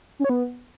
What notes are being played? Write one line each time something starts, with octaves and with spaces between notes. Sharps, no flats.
C#4
C#5
B3